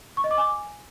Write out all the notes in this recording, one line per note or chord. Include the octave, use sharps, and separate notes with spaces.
C#6
D#5
D6
G#5